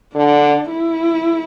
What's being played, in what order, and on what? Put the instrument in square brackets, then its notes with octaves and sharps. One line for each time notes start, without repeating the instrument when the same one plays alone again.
[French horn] D3 [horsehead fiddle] D4
[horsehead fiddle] E4